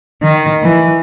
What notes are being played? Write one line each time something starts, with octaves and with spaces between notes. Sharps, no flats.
D#3
E3